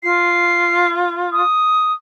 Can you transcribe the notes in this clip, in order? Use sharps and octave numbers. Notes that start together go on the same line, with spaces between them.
F4 C7
D#6